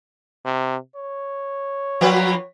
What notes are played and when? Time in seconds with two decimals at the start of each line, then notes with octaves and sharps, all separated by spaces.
0.45 C3
0.96 C#5
2.01 F3 A#3 B4